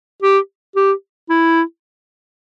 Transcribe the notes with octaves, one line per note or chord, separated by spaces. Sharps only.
G4
G4
E4